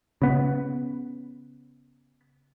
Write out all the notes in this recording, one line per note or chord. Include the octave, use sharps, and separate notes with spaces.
C#3 B3